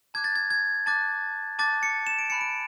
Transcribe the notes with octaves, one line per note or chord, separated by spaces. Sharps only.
A5 D6 F#6 G#6
A6
G#6
G#6
A5 D6 F#6 A6
A5 D6 F#6 A6
C#7
E7
D7
G#5 B5 F#6 C#7
D7